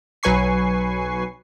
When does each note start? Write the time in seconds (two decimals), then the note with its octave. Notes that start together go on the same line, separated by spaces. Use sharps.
0.23 B1 F#3 B4 G#5 C#6 C7